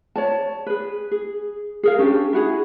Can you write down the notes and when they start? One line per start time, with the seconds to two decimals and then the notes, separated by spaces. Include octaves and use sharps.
0.16 C#5 D5 A5
0.66 G#4 B4
1.11 G#4
1.83 G#4 A#4 F5
1.99 C#4 D4 G4
2.33 E4 F#4 G#4